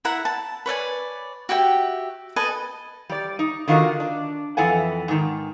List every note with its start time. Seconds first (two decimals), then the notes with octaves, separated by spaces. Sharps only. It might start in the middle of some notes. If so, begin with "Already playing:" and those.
0.05 E4 E5 F#5 A#5
0.25 A5
0.66 B4 C#5 D5 G#5
1.49 F#4 G4 E5 G5
2.36 A4 B4 D#5 G#5
3.09 G3 D5
3.39 D#4
3.68 D3 D#3 F4 F#4 A#4 D#5
4.00 D4
4.57 F2 E3 A4 F#5 G#5
5.08 G#2 D#3